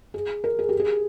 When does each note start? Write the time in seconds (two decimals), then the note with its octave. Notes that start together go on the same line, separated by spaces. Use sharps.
0.14 G#4
0.44 A#4
0.59 G#4
0.69 G4
0.80 G#4